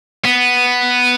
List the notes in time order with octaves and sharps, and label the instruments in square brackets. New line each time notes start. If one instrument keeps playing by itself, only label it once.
[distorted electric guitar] B3